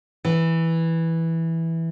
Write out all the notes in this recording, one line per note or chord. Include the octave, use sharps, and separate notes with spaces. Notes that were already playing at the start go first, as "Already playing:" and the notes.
E3